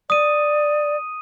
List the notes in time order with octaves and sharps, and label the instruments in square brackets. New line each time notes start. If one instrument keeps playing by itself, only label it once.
[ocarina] D5 [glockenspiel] D#6 D#7